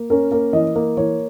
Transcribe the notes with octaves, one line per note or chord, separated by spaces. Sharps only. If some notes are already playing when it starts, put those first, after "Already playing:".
Already playing: A#3
C#4 A#4
A#3 A#4
E3 D#5
A#3
E3 C#5